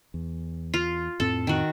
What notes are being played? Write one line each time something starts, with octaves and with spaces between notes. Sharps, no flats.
E2
F4
F2 A2 C4 A4
D#3 F#4